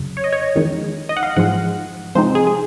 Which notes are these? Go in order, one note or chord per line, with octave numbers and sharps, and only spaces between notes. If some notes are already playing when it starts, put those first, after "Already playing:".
Already playing: F2 C#3 F#3
C#5
D#5
C#5
F2 D#3 G#3 D#4
D#5
F#5
F5
G#2 F3 G#3 F#5
C3 F3 G#3 C4 D#4 C5
G#4
G#4